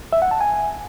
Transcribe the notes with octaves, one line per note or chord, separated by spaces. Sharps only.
E5
F#5
A5
G#5